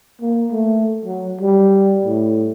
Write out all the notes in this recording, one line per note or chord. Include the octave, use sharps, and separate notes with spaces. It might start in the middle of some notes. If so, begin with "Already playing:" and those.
A#3
A3
F#3
G3
A2